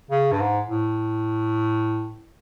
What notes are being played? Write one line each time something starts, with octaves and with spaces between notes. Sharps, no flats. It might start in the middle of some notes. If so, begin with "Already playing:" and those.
C#3
G2
G#2
A2